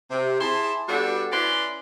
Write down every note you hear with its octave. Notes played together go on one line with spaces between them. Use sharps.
C3
E4 G#4 A5 C6
G3 B3 D4 F#4 A4
C#4 E4 B4 D5 C6